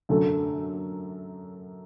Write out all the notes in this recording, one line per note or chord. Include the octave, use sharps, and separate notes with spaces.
F#2 D3 F#3 A3